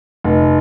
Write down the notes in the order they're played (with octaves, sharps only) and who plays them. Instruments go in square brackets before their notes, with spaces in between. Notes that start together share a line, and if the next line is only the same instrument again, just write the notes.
[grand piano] F1